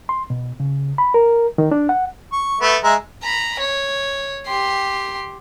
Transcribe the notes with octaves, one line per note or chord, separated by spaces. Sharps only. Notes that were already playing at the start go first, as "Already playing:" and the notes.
C6
B2
C#3
B5
A#4
D#3
D4
F#5
C#6
A3 B3
G#3 E5 A#5
A#5 B5
C#5
G4 C6